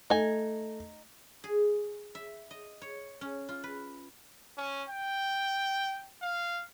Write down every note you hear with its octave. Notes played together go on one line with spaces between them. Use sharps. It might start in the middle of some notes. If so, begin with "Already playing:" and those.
A3 D#4 G#5
G#4
E5
D#5
C#5
C#4
F4
B4
C#4
G5
F5